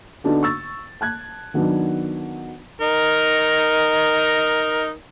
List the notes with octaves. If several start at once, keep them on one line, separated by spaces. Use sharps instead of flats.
D3 B3 D4 D#4 F#4 A4
C#6 E6 A6
A5 F#6 G#6
D#3 F#3 B3 D4 D#4
D#4 A#4